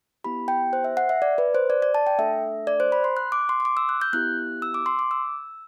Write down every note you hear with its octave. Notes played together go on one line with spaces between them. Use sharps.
B3 E4 G4 B5
G5
C5
E5
F#5
E5
D5
B4
C5
D5
D5
A5
G5
A3 D4 A4 E5
D5
C5
B5
C6
F#6
D6
C6
C6
D6
E6
F#6
G6
B3 E4 G4 F#6
E6
D6
C6
D6
E6